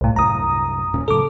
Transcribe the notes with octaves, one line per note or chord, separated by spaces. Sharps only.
C2 A2
C2 F#2 A#5 D#6
D#1 A#2 C#4
A2 C#3 F#3 A4 D6